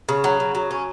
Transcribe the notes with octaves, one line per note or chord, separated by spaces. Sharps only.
C#3
F#3
C#3
F#3
C#4